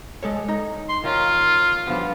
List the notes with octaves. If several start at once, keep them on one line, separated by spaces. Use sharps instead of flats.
G#3 A4 C#5
D#4 A#5
C6
D#3 A#3 C#4 F4
D3 F3 G3 B3